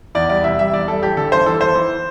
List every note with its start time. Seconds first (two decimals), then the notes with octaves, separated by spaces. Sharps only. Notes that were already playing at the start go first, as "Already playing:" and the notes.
0.15 E2 D5
0.29 G3 D5
0.44 C2 E5
0.59 G3 E5
0.74 E2 D5
0.88 G3 A4
1.02 A1 G4
1.17 D3 A4
1.32 G1 C5
1.46 E3 A4
1.61 G1 C5
1.75 E3